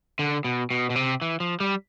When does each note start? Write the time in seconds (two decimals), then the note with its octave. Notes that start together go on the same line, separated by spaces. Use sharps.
0.19 D3
0.44 B2
0.71 B2
0.90 B2
0.96 C3
1.22 E3
1.40 F3
1.60 G3